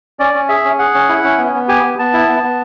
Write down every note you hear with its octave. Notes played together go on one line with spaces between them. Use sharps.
C#4 D5
C#4
G#4 E5
C#4
G#4 F#5
C#4
E4
C#4
B3
B3
G4 G#5
B3
B3 A5
E4
B3
B3